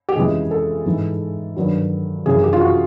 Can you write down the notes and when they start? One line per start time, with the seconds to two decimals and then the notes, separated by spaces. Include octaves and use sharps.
0.09 G4
0.15 F2 C#3 E3 G#3 G#4
0.51 A4
0.86 G#2 E3 G#3
1.57 G2 D#3 F#3
2.26 F#2 C#3 E3 G#4
2.43 G4
2.53 F4
2.61 F#4